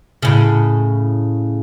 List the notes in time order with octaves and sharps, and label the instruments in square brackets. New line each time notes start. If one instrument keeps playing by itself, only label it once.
[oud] A2 C#3